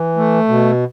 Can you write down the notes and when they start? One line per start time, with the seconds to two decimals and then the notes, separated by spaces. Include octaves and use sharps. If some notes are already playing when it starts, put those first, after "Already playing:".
Already playing: E3
0.17 A3
0.48 B2